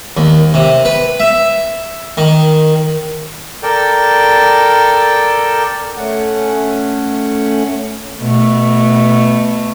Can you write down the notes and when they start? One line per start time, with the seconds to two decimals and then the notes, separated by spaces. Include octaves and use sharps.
0.17 D#2
0.54 C3
0.85 B4
1.20 E5
2.17 D#3
3.63 A4 A#4 D5 G5
5.97 A3 C#4 F#5
8.21 B2 A3